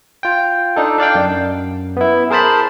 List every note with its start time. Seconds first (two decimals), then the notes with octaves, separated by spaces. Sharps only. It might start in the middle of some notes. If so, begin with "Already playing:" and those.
0.23 F4 G5
0.76 D4 D#4 A4
0.98 D4 D5 F5 G5
1.15 F#2
1.97 B3 E4
2.30 G#4 A#4 C5 A5 B5